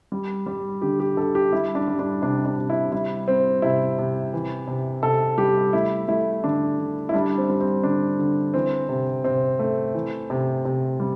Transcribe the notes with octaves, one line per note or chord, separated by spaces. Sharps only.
G3
G3
D3 G4
G4
D3 A4
G4
G3 E4
D4
G3
D4
C3 D4
D4
C3
E4
G3 E4
G3 C4
C3 E4
C3
E3
C3
C3 A4
G3 G4
A3 E4
A3 E4
D3 D4
D3
E4
G3 D4
C4
G3
C4
D3 D4
D3
E3 C4
C3
C3 C4
A3
E3
C3
C3
G3